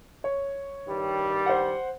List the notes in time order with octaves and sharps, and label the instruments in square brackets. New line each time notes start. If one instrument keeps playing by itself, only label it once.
[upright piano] C#5
[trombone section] G2 D#3 G3
[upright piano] C5 F#5